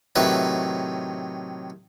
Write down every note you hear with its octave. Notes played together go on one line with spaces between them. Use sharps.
A2 C3 D#3 F#3 B4 E5